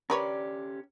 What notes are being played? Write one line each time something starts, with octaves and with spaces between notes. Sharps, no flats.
D3 C#4 G4 A#4 B4 C#5 D5